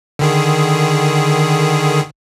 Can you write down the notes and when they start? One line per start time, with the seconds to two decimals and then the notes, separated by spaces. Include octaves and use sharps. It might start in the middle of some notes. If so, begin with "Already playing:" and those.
0.19 D3 D#3 G#4